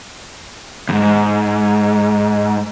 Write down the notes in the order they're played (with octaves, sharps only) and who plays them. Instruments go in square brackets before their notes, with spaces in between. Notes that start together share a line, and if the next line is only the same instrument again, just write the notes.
[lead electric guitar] D#2 G#2